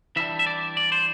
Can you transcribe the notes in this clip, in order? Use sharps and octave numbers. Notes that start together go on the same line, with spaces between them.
E3 G3 D4 E5
E5
D5
D5
C5